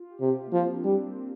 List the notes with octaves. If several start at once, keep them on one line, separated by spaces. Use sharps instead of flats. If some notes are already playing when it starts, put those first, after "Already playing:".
Already playing: F4
G4
C3
F4
A#3
F3 C4
D4
G3
C4